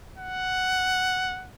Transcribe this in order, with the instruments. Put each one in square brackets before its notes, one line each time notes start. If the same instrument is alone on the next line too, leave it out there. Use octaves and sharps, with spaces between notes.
[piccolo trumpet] F#5